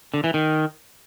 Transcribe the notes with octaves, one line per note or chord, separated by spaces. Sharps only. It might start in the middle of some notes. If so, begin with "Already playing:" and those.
D3
E3
D#3